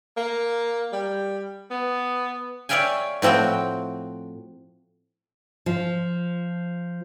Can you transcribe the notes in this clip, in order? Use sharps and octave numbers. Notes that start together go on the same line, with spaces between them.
A#3
G3
B3
C#5 D5 E5 F5 G5 G#5
A2 F3 C4 F#4 G5
F3